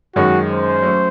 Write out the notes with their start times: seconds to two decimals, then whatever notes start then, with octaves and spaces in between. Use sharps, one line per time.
0.16 F#2 D#3 G#3 C#4 F#4
0.50 C5
0.83 F#3 A3 C#4